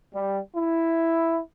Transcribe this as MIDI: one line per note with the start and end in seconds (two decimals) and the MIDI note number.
0.14 0.40 55
0.54 1.40 64